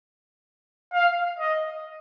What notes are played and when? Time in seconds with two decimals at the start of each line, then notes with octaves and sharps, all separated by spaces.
0.93 F5
1.39 D#5